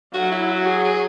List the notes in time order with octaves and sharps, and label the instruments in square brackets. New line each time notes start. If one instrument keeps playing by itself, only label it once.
[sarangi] F#3 [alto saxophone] F#4
[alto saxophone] E4
F#4
G#4
G#4